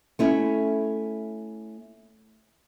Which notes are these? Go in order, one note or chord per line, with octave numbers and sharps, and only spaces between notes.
A3 C#4 E4